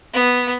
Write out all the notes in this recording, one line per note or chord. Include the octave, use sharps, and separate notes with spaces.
B3